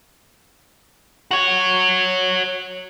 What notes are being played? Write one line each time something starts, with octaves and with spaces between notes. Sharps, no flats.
F#4 C#5